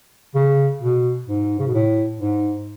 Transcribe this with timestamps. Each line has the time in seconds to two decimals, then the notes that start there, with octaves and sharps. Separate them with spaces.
0.35 C#3
0.82 B2
1.28 G#2
1.59 C#3
1.67 B2
1.74 A2
2.19 G#2